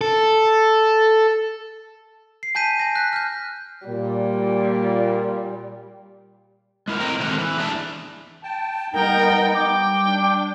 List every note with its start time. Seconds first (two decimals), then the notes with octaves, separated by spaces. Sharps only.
0.01 A4
2.43 C7
2.55 G#5 A5 G6 B6 D#7
2.79 G#5 A#6
2.95 F#6 B6
3.13 F6 G6
3.87 A#2 G3
6.88 G#3 E4 A#4
7.00 A2 G#3 C4 D#5 G5 A#5
7.20 D#3 F#3 G#3 A3 C4 A#4
7.39 E3
7.57 E2 D4 G#4 D5 E5 A5
8.43 G5 A5
8.94 G3 B3 D#4 A#4 G5
9.54 G3 G5 D6
10.08 D4